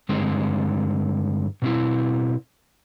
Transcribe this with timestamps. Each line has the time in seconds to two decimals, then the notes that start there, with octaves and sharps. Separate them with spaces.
0.09 G2 D3 G#3 C4
1.62 B2 C4 E4